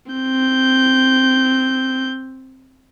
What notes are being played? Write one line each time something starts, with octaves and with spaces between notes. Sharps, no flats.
C4 G6